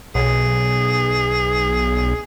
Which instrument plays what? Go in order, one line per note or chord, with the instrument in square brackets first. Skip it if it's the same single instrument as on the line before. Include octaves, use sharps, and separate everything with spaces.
[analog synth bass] B1 [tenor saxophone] G#4